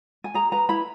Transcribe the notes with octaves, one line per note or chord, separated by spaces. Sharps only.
G#5
G#4 A#5
B4 A#5
E4 B5